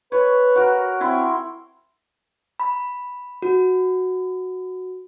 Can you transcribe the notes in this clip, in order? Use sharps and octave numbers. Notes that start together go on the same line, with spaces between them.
B4 C#5
F#4 A#4
C4 E4 C6 C#6
B5
F#4